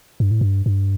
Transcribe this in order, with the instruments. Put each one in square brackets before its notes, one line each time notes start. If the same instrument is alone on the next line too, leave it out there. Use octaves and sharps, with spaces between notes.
[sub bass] G2
A2
G2
G2